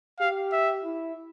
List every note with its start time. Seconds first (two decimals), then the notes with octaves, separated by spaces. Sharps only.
0.20 G4 F5
0.52 E5
0.84 E4